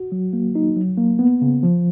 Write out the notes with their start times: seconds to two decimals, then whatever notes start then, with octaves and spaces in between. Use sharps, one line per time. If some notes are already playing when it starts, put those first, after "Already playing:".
Already playing: F#4
0.12 F#3
0.33 A#3
0.55 D#4
0.76 F#3
0.97 A#3
1.19 B3
1.42 C#3
1.63 F3